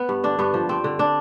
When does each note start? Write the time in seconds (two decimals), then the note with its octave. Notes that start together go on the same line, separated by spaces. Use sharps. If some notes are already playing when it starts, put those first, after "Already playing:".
Already playing: B3
0.09 G2
0.24 D3 D4
0.39 G2 B3
0.54 F3
0.69 G2 C4
0.84 D3
0.99 D4